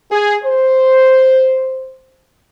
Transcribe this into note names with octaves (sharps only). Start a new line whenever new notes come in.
G#4
C5